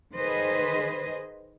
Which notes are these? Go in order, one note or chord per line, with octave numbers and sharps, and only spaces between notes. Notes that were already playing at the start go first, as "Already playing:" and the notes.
D#3 G#4 B4 C5 D#5